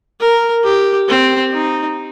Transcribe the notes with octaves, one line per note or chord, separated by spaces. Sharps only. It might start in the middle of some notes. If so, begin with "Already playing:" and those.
A#4
G4
C4
D#4